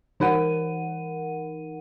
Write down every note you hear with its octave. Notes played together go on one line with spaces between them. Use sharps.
E3 D#4 A#4 F#5 D#7